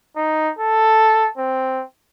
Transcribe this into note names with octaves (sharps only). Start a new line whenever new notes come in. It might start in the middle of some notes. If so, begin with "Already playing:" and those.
D#4
A4
C4